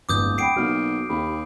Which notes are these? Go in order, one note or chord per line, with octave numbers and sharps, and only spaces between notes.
D1 G1 D6 D#6 G6
F#5 G5 B5 C7 D7
B1 A#3 F#4 F6
D#2 G4 B5